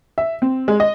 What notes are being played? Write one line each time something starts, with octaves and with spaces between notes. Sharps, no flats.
E5
C4
G#3
D#5